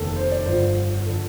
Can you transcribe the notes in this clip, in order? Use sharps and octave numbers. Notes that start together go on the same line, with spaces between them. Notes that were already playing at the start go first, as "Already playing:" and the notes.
Already playing: F1 D#2 D#3 A4
C5
D5
G1 G2 D3 F3 C5
D3 F3 A4